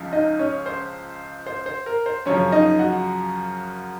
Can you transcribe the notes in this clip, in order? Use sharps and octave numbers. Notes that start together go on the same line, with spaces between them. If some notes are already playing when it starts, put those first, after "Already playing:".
Already playing: C#2 C#3 F3
D#4 D#5
C#4 C#5
C5
C5
C5
A#4
C5
F#2 C#3 F3 C#4 C#5
D#4 D#5
F#4 F#5